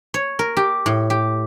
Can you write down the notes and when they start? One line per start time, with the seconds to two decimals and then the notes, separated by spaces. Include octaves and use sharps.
0.14 C#5
0.39 A#4
0.57 G4
0.86 A2
1.10 G4